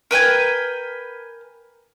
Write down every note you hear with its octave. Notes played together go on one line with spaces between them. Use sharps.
A#4 B4 G5 G#5